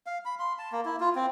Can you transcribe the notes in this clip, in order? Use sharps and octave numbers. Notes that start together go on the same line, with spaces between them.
F5
B5
C6
A5
A#3
E4
F4
C4